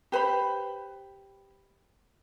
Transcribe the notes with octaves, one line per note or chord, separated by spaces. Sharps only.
G4 B4 C5 B5